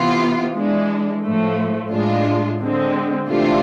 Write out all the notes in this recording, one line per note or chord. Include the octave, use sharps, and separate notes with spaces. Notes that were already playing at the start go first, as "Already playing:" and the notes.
Already playing: C3 E3 B3 F4
E3 G#3 D4
A2 F3 A3
A2 G#3 D4 F4
D3 G#3 C4
C3 E3 A3 D4 F4